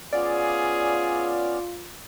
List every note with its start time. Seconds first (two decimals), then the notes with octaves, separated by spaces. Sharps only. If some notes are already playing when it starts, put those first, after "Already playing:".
0.13 B3 C#4 F4 G#4 D5 F5